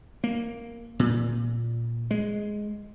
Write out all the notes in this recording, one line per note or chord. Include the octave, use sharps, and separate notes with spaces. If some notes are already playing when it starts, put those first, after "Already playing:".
A#3
A#2
G#3